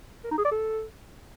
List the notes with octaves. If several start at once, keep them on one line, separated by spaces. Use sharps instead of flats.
A#4
D#4
G#4
D5
A4